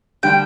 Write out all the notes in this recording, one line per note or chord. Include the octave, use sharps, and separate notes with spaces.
D3 G3 G5